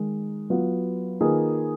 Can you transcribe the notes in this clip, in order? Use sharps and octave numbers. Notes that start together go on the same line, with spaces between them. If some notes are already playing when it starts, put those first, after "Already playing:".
Already playing: D#3 G#3 D#4
F#3 B3 F4
D#3 A#3 F4 G#4 B4